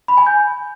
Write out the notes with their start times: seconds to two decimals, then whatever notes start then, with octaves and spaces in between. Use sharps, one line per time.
0.08 B5
0.17 G#5
0.27 G6